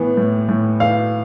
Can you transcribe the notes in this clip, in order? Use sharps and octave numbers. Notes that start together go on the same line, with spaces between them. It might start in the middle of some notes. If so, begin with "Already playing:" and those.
Already playing: A2 E3 B3
A2
A2
E3 F5